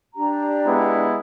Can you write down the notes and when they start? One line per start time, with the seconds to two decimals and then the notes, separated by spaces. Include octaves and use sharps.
0.14 D4 G4 A#5
0.66 G#3 B3 E4